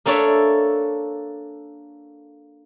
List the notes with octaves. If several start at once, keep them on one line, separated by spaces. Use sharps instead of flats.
A#3 D4 A4 C#5 D5 E5